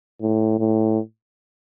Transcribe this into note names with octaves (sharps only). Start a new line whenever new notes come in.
A2
A2